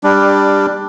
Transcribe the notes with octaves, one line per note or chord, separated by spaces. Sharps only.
G3 D4